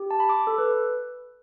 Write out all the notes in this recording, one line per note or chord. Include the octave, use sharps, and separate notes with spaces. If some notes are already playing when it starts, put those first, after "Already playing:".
Already playing: G4
A5
B5
D6
A4
B4